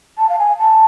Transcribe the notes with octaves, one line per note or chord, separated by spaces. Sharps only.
A5
F5
G#5
A5